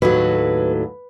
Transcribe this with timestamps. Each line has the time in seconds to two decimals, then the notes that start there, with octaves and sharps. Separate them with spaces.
0.02 D#2 A2 F#3 B4